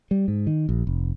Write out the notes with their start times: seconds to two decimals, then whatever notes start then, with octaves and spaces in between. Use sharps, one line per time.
0.11 G3
0.28 G#2
0.47 D#3
0.69 A#1
0.87 F1